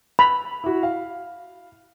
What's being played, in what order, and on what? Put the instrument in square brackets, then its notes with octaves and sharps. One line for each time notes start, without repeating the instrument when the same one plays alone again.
[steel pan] B5 [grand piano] F7
[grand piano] E4 F#4
F5